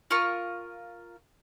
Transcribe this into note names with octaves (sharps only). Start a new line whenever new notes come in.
F4 A#4 C#6